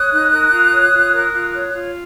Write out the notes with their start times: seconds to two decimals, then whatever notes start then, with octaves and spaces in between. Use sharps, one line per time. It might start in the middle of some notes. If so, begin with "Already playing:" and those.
Already playing: C#5 D#6 F#6
0.10 D#4
0.31 A#4
0.51 F4
0.71 C#5
0.92 F4
1.12 A#4
1.33 F4
1.53 C#5
1.73 F4